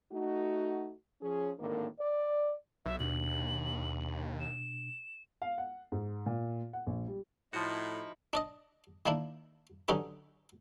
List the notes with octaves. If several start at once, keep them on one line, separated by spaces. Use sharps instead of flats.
A3 D#4 F#4
F3 C#4 G#4
G#1 A2 D3 D#3 A#3
D5
B1 E5
D#2 B2 D4 F#7
E7
F5
F#5
G#2
A#2
F#5
A#1
G3
A2 F3 D#4 E4 F#4
D4 D5 D#5
D#3 A#3 D4 E4
D3 F#3 C#4 D#4 G4 B4